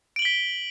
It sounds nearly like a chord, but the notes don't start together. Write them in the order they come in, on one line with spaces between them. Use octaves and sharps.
D7 F#7 G7 B6